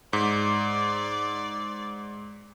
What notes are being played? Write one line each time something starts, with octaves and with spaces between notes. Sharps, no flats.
G#2 D5